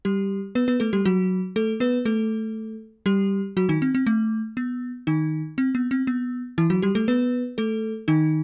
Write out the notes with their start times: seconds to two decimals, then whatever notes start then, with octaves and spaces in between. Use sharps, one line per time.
0.05 G3 G4
0.55 B3 B4
0.68 B3 B4
0.80 A3 A4
0.93 G3 G4
1.05 F#3 F#4
1.56 A3 A4
1.80 B3 B4
2.05 A3 A4
3.06 G3 G4
3.57 F#3 F#4
3.69 D#3 D#4
3.82 C4
3.95 C4
4.07 A3
4.57 B3
5.07 D#3 D#4
5.58 C4
5.75 B3
5.91 C4
6.07 B3
6.58 E3 E4
6.70 F#3 F#4
6.82 G3 G4
6.95 A3 A4
7.08 B3 B4
7.58 A3 A4
8.08 D#3 D#4